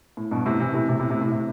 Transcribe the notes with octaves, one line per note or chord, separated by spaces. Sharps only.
A2
G2 B2
A2 C3
C3 E3
A2 C3
A2 C3
A2 C3
A2 C3
A2
A2 C3